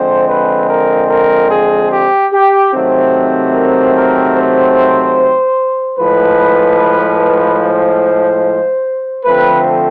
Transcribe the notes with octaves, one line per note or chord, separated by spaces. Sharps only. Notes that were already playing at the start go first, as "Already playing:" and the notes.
Already playing: D3 F3 G#3 C4 C5
B4
A#4
A#4
G#4
G4
G4
C3 D#3 F#3 A3 C4
A#4
A#4
C5
A2 F3 G#3 B4
C5
D3 F3 A3 C4 B4